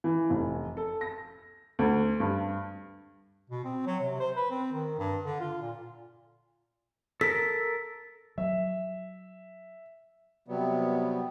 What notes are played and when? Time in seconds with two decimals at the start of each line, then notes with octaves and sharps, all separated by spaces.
0.04 E3
0.30 F1
0.77 A4
1.01 A#6
1.79 D2
2.20 G2
3.50 B2
3.64 C4
3.86 F#3
4.00 C3
4.20 C5
4.36 B4
4.50 C4
4.72 D#3
4.98 G2
5.24 D3
5.40 F4
5.61 A#2
7.21 A4 A#4 B6
8.38 F#3 E5
10.48 C3 F#3 G3 B3